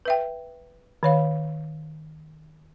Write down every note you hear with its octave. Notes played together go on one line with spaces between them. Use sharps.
B4 E5 G5
D#3 C#5 F5